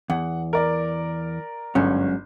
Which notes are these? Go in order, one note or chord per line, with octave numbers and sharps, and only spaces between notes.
E2 F#5
A#4 D5
G1 G#2 F#3 C#4